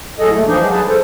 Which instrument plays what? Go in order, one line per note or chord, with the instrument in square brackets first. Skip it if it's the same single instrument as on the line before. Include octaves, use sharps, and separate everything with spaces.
[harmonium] A2 F#3 G#4 A4 D#5
D#2 A3
E3 F3 D4 D#4
F#3 G#3
G#4 B4 A5
A4 C5